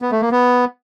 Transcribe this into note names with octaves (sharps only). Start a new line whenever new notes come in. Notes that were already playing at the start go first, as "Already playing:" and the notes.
B3
A3
A#3
B3